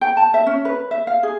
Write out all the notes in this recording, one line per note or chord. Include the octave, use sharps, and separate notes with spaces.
G5
A5
E5
C#4
B4
E5
F5
G#4